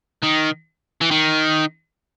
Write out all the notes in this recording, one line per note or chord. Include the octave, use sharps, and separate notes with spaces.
D#3
E3
D#3